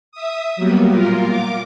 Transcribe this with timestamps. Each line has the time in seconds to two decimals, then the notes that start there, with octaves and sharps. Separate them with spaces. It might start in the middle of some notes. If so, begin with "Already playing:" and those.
0.12 E5 D#6
0.56 F#3 G3 A#3 B3
0.91 A#2 F4 A#4
1.29 D6